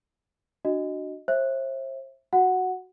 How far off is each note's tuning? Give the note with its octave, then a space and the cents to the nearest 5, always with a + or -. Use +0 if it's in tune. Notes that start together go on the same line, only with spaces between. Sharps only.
D4 +20 F#4 +5 D#5 +0
C5 +35 E5 +0
F#4 +0 F#5 +0